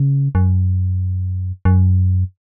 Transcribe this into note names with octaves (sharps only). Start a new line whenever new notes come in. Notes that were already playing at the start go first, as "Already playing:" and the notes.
Already playing: C#3
F#2
F#2